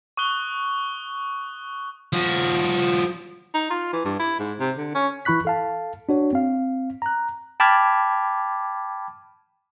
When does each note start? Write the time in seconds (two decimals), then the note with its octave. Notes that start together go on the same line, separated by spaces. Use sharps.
0.17 C#6 D#6 F#6 G7
2.13 F3 F#4
3.54 D#4
3.71 F4
3.93 E3
4.05 G2
4.20 E4
4.39 G#2
4.60 C3
4.78 D3
4.95 C#4
5.25 E3 E4 B5 C#6 F#6 B6
5.45 A4 F5 A5
6.09 D4 F#4 C#5
6.33 C4 F5
7.02 A#5 F#6
7.60 G5 A5 B5 D6 F6 G#6